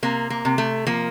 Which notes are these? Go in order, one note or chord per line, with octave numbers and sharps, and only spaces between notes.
C3 A#3
A#3
C3
A3
F3 A#3